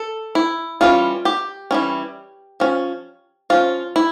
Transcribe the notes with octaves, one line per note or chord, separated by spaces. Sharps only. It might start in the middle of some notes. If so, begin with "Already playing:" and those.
Already playing: A4
E4
E3 G3 C#4 F4
G4
E3 G3 C#4
F3 C#4
F3 C#4 F4
E4